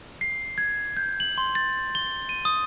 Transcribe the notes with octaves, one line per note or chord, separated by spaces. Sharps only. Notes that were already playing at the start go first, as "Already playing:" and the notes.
C7
G#6
G6
F#7
C6
A6
G7
D#7
D#6